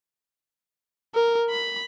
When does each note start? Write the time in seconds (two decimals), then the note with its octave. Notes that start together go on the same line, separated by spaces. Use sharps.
1.15 A#4
1.51 B5